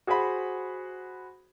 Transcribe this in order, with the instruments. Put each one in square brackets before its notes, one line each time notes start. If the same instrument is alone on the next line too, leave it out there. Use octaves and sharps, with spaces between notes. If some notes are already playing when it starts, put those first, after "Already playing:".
[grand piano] F#4 G#4 C5 F#5 B5